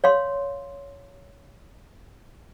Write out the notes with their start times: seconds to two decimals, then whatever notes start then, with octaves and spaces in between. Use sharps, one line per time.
0.04 C#5 F5 C6